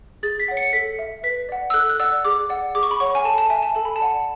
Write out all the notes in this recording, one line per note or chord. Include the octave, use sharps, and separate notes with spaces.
G#4 A6
B6
C#5 F#5
C#7
A4 B6
E5
B4 B6
D5 F#5
E6
A4 F#6
F#6
D5 F#5 E6
G#4 D6
D5 F#5
G#4 D6
C#6
B5
C#5 F#5 C#6
G#5
A4 A5
A5
E5 G#5
A5
A4 A5
B5
A5
D5 F#5